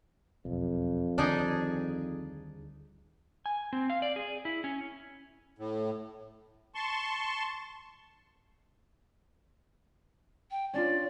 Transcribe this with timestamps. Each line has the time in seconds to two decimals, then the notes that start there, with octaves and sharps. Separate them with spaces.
0.45 E1 B1 F2
1.18 D2 D#3 G3 D4 D#4 G#4
3.46 G#5
3.73 C4
3.90 F5
4.02 D5
4.16 G#4
4.45 E4
4.64 C#4
5.58 A2
6.75 A5 C6 C#6
10.51 G5
10.74 C#4 D4 F4 D5